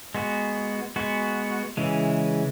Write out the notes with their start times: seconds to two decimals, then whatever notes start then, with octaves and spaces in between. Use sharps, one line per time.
0.15 G#3 B3 F#4
0.96 G#3 B3 F#4
1.77 C#3 E3 G#3